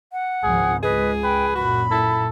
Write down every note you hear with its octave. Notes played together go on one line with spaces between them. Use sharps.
F#5
G#1 C#2 F3 G#4
C#2 G#4 B4 D#5
B4 G5
F#2 A#2 F#4 B5
E4 A4